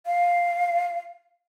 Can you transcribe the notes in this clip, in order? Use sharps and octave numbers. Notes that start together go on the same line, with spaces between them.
F5